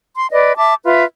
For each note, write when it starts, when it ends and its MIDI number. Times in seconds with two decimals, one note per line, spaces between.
0.16 0.27 84
0.31 0.56 71
0.31 0.56 74
0.31 0.56 75
0.56 0.74 76
0.56 0.74 81
0.56 0.74 86
0.83 1.04 65
0.83 1.04 71
0.83 1.04 76